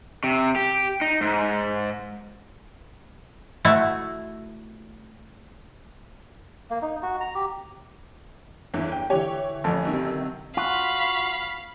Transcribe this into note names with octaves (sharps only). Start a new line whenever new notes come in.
C3
G4
D#4
G#2
A3 E4 F#4
A#3
D#4
F#4
A#5
G4
G1 E2 E3
G5
D3 E3 G4 C#5
A1 F2 D3
C3 D#3 F#3
F4 F#4 F5 B5